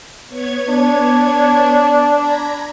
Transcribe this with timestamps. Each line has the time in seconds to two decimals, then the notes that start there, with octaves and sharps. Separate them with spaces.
0.29 B3 C#5 G#6
0.69 D4
2.17 A#5 B5 G#6